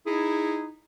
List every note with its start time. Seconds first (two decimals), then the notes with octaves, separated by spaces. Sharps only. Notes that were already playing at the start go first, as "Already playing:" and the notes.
0.07 D#4 E4 G#4